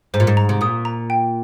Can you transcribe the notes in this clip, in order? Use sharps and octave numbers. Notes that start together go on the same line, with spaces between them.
G#2 C5
A#2
G#2
A#5
C3
A#2 D#6
A#5
G5